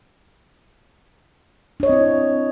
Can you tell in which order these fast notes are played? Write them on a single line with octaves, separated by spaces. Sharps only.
D4 C#5 D#5 C4 E4